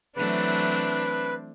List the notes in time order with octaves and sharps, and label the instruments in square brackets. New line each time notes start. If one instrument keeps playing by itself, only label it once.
[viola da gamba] E3 F#3 A3 [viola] C4 D4 [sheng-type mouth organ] B4